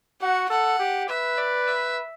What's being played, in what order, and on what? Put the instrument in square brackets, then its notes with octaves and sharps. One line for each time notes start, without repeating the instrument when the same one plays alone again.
[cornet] F#4 [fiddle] F#5
[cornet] A4 [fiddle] F#5
[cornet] G4
[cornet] B4 [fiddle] E5
[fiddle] D5
E5